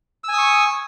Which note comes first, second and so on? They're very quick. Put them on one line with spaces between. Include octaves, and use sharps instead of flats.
E6 G#5 D#6 C#6